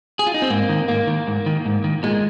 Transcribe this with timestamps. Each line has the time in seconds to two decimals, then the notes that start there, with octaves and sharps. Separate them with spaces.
0.19 G#4
0.27 F4
0.34 D#4
0.42 C4
0.50 G#2 A#3
0.69 D#3
0.88 G#2 A#3
1.07 D#3
1.27 G#2
1.46 D#3
1.65 G#2
1.84 D#3
2.03 A#2 G#3